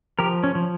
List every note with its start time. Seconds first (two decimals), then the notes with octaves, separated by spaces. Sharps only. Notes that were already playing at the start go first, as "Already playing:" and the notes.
0.19 F3 G4 A#4
0.44 C#4
0.55 F3